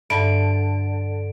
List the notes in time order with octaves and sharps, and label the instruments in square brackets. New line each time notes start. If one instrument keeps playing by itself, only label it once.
[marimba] G2 E5 [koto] D3 [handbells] D7